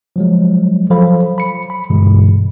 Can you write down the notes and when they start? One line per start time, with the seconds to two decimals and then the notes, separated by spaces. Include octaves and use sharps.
0.16 F3 F#3 G#3
0.90 F3 F#3 A4 C5 F5 B5
1.38 B5 C#7
1.70 B5
1.90 G2 B2 D3 E3 G#3